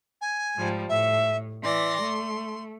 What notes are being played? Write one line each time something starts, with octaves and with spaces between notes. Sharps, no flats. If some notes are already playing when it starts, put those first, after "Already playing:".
G#5
G#2 F3 G3
A2 E5
E3 D5 C6 A#6
A3